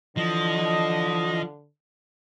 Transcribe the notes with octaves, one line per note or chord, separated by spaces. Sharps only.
D3 E3 F3 D#5